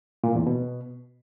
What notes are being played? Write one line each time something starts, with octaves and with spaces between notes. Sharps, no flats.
A#2
E2
B2